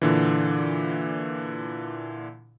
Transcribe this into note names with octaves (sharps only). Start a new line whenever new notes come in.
A#2 D3 E3